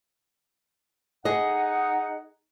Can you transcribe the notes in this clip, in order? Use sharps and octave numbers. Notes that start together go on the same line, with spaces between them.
D#4 G#4 D#5 F#5